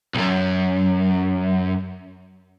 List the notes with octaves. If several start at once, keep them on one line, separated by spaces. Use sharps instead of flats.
B1 F#2